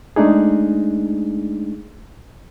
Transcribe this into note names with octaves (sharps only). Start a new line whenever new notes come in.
G#3 A3 D4 D#4 G#4